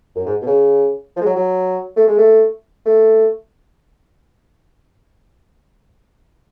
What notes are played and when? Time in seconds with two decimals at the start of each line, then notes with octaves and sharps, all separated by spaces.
0.15 F#2
0.26 G#2
0.42 B2
0.47 C#3
1.16 F3
1.21 G#3
1.26 F#3
1.36 F#3
1.96 A3
2.07 G#3
2.18 A3
2.86 A3